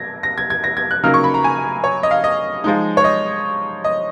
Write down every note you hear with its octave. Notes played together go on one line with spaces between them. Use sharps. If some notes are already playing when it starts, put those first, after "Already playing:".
Already playing: G#6 A#6
A#6
G#6
G#6
A#6
G#6
F#6
C#3 F#3 A#3 D#4 F6
C#6
B5
A#5
G#5
C#5
D#5
F5
D#5
F3 G#3 D#4
C#5
D#5
D#5